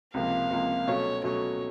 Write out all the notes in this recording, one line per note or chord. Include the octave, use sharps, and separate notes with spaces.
C#2 C3 F3 A#3 F5
C#2 C3 F3 A#3
B2 F#3 A3 C#4 C#5
B2 F#3 A3 C#4 C#5